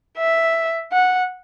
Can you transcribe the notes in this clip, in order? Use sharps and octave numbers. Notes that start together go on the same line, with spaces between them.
E5
F#5